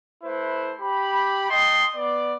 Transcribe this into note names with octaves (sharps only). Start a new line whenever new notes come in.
A3 E4 B4 C5
G4 B5
D#5 G5 A5 C6
B3 D5